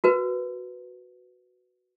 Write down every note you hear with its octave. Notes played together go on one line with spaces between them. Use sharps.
F#4 A#4 B4